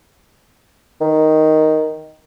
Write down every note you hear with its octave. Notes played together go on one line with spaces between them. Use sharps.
D#3